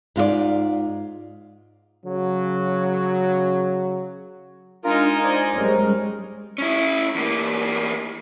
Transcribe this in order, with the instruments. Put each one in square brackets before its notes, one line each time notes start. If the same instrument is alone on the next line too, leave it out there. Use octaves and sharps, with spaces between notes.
[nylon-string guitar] G#2 F4 F#4 D5
[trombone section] C#3 F#3
[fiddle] G#3 D#4 [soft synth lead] D4 [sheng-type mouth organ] F4 A#4
[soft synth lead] C5 [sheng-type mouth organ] D5 G#5
[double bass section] G3 G#3 C#4 [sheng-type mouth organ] A#4
[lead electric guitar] C#4 E4
E2 A#3